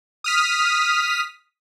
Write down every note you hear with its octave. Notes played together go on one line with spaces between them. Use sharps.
D#6 F6 B6